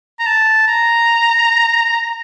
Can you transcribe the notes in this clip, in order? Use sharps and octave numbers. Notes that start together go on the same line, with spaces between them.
A#5
A5
A#5